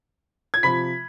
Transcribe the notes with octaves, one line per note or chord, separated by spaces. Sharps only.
G#6
C3 F3 B5 B6